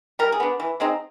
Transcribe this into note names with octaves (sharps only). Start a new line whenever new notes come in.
G3 A#4
G#4
B3 D4
E3
G#3 C4 D#4